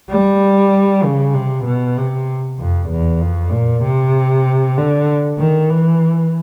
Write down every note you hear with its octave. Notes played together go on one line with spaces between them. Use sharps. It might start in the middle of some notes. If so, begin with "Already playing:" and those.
G3
C#3
C3
B2
C3
F2
E2
F2
A#2
C3
D3
D#3
E3